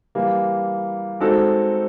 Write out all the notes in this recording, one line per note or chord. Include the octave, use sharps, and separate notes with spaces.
E3 G3 A#3
G#3 C4 D#4 F#4 A4